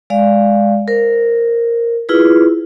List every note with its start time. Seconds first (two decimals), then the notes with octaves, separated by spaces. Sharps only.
0.10 G#3 D5 F5
0.88 A#4 C5
2.09 E4 F4 G#4 B4